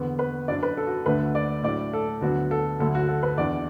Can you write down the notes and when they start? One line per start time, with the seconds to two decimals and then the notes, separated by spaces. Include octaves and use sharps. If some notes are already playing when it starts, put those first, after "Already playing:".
Already playing: E2 D3 B3
0.19 B4
0.48 F#2 F#3 D4 D5
0.63 B4
0.77 A4
0.87 F#4
1.06 D2 D3 A3 D4 B4
1.35 D5
1.63 A2 F#3 D4 D5
1.93 A4
2.21 D2 D3 F#3 B3 D4 F#4
2.51 A4
2.79 D2 D3 F#3 A3 A4
2.95 F#4
3.08 A4
3.23 B4
3.38 E2 E3 D4 D5